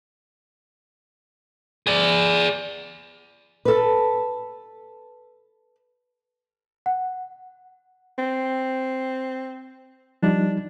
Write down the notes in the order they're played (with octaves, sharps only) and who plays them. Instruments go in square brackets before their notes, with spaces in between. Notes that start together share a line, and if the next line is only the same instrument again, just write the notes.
[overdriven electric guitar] G#4 D5
[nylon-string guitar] A4 B4
[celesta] F#5
[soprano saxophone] C4
[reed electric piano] F3 G3 D#4 [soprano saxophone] D4